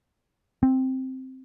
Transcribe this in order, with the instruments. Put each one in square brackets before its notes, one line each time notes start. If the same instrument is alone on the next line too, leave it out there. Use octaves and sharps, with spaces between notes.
[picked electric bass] C4